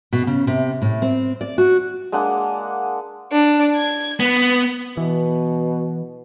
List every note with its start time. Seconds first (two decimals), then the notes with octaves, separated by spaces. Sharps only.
0.13 B2
0.27 C#3
0.47 C3
0.82 A2
1.02 C4
1.41 D5
1.58 F#4
2.12 G#3 A#3 D4 F#5
3.32 D4
3.76 G#6
4.20 B3
4.97 B2 E3